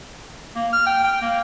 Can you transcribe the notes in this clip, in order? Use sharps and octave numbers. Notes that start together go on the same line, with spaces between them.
A#3
F6
G5
G5
A#3